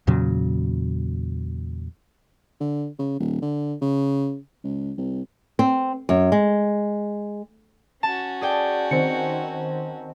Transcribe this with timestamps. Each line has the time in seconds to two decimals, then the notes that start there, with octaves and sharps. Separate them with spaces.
0.07 E2 A#2 C#3 F#3
2.60 D3
2.99 C#3
3.19 D#1
3.42 D3
3.82 C#3
4.64 C#2
4.98 C2
5.59 C4
6.09 F#2
6.32 G#3
8.03 C#4 F#4 A5
8.41 G#4 D5 G5
8.91 D#3 C4 C#7